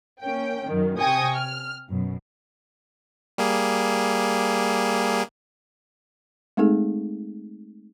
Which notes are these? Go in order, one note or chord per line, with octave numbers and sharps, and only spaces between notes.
A#3 C#4 G5
F#2 D#3
C3 G5 G#5 C#6 D#6 A#6
F6
F#2 B2
G3 A#3 G#4
G#3 A3 C4 D#4 G#4 A4